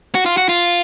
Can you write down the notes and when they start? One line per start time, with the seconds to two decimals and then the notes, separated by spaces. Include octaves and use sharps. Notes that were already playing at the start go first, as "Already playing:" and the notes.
0.15 F#4
0.26 F4
0.37 F#4
0.49 F4